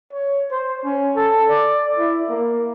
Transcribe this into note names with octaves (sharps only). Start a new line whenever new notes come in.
C#5
C5
C#4
A4
D5
E4
A#3